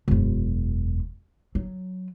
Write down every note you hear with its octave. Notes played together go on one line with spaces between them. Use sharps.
E1 F#2
F#3